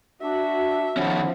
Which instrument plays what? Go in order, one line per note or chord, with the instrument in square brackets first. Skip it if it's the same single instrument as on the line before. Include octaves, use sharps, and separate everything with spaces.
[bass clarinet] D4 [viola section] F#4 [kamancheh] E5
[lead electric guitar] D#3 C#4 [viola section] F3 [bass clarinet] B3